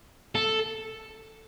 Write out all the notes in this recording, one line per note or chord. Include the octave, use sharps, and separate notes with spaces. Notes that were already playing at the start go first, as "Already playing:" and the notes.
A4